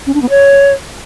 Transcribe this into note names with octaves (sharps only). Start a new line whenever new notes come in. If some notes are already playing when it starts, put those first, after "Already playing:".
C#4
D4
B3
C#5